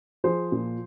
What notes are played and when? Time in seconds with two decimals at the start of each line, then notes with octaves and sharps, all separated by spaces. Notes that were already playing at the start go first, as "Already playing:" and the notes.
0.24 F3 G#4 C5
0.52 A#2